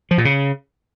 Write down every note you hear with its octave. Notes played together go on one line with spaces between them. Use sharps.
F3
A#2
C#3